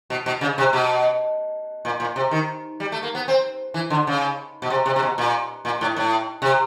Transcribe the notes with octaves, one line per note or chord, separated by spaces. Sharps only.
B2
B2
C#3
C3
B2
A#2
A#2
C3
D#3
G3
A3
A#3
B3
C4
E3
D3
C#3
B2
C3
C3
C3
B2
A#2
A#2
A2
A2
C3